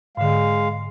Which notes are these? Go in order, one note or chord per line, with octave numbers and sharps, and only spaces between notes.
G#2 D3 G#3 F5